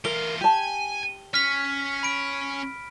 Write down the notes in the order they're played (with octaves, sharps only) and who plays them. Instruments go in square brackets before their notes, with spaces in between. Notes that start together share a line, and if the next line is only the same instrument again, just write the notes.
[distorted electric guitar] E3 F4 [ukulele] A#4 [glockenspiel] G7
[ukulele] G4 A5 [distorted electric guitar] G#5
[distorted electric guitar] C#4 [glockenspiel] F6 B6
[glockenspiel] B5 D7